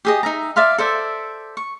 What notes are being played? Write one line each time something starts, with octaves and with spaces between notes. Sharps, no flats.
G4 G#4 D#5
D#4 E5 A#5
D5 E5 F5 C6
A4 C5 D5 E5
C#6